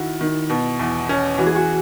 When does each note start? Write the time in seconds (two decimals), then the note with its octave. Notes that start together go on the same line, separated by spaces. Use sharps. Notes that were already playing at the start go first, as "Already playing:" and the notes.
Already playing: D#3 E4 F#4
0.21 D#3
0.50 B2
0.79 E2
1.09 C#4
1.38 E3 F#4
1.46 G#4
1.55 F#4